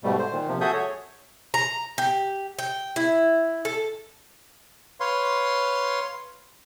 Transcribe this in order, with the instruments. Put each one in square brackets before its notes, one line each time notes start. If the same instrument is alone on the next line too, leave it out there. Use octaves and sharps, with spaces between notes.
[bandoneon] G#2 B2 G3 A3
C5
A#2 D#3
C3 F3
F#4 G#4 A4 E5 D#6 G6
C#5
[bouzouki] A#5
G4
G5
E4
A4
[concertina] B4 C#5 F5 C6